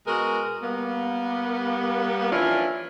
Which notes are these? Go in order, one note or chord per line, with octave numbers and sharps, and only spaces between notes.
B2 G#3 F#4 A#4
G3 A#3 B3
E3 F3 C#4 D4 E4 F4